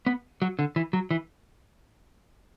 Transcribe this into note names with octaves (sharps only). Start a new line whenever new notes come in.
B3
F#3
D3
E3
F#3
E3